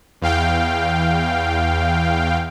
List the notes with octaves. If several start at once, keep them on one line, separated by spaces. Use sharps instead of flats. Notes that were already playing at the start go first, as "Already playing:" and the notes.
E2 F5 G5